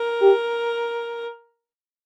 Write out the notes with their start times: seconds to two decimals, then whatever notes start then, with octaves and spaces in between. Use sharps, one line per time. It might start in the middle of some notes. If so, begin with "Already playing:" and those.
Already playing: A#4
0.22 G4